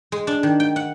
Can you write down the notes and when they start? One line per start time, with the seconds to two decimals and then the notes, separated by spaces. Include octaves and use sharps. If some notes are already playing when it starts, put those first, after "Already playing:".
0.12 G#3
0.27 D4
0.43 D#3
0.60 G5
0.76 F#5